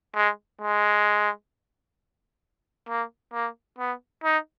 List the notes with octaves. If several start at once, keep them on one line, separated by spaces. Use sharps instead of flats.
G#3
G#3
A#3
A#3
B3
D#4